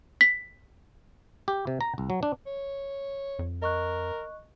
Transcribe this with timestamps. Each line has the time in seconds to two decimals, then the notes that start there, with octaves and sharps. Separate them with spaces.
0.21 B6
1.48 G4
1.67 C3
1.81 A#5
1.98 C2
2.10 F#3
2.23 D4
2.46 C#5
3.39 F2
3.62 A#4 D#5 C#6 F#6